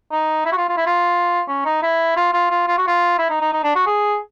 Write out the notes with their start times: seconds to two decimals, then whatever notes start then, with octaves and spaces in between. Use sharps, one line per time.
0.12 D#4
0.45 E4
0.52 F#4
0.57 F4
0.69 F4
0.77 E4
0.86 F4
1.48 C#4
1.65 D#4
1.82 E4
2.16 F4
2.33 F4
2.51 F4
2.68 F4
2.78 F#4
2.87 F4
3.18 E4
3.30 D#4
3.41 D#4
3.52 D#4
3.64 D4
3.75 F#4
3.87 G#4